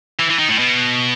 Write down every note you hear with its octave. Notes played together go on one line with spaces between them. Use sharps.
E3
E3
D#3
A2
B2